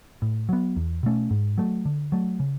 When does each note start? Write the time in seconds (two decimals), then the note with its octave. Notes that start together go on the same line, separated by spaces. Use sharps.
0.22 A2
0.49 F#3 B3
0.76 E2
1.03 B2 A3 C#4
1.31 G#2
1.58 F#3 A3
1.85 D3
2.12 F#3 A3
2.40 C#3